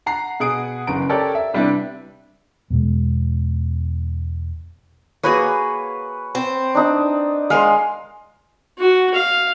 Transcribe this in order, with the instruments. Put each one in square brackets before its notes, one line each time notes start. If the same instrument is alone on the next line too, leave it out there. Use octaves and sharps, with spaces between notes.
[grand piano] F#5 A#5 C7
B2 G#4 F#5 D#6 D7
F#1 C#3 B4 A#5 D7
G4 A4 A#4 C#5 D5
E5
C3 G3 B3 D4 E4 B4
[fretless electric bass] E2 B2 G#3
[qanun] A#3 F#4 G#4 [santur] B4 C#5
[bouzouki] C4
[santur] D4 D#4 D5
[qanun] G#3 A#4 [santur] F5 C6
[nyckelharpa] F#4
F5